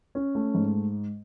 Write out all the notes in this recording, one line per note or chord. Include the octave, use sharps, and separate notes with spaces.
C#4
A3
G#2